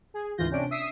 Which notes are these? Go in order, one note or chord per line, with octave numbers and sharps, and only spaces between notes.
G#4
D2 G#2 E3 F4 G6 A#6
C3 C#4 D4 D7
E5 D#6 E6 B6 C7